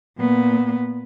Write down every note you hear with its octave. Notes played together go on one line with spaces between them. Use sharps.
A#2 B3